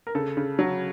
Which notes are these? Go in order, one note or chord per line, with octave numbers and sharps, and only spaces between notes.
A#4
C#3 A4
C#3
F#3